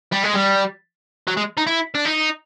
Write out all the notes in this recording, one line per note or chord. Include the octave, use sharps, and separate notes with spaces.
G3
G#3
G3
F#3
G#3
D#4
E4
D4
D#4